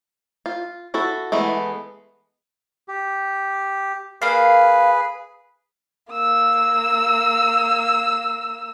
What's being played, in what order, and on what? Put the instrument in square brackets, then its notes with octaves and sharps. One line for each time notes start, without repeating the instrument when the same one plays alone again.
[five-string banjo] F4
E4 F#4 A4
E3 G#3 A3 B3
[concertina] G4
[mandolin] A#3 F5 [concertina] G#4 B4
[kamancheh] A#3 E6